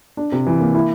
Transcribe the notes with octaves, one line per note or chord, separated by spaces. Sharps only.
D4
C3
E3
A#3
E4